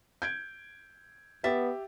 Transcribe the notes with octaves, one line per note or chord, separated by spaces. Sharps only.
G6 G#6 D7
B3 G4 E5 A6